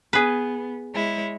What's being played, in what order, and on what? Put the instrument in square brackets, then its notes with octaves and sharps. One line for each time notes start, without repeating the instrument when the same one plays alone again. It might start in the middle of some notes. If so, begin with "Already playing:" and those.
[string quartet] B3 [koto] G#4 B4
[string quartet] G#3 E4 C#5